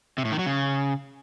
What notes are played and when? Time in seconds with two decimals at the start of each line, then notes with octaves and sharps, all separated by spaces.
0.18 C3
0.25 A2
0.32 D#3
0.39 F#3
0.46 C#3